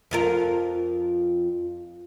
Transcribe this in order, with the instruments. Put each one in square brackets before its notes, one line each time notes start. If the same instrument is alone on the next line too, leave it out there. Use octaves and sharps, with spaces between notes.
[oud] F2 F4 A#4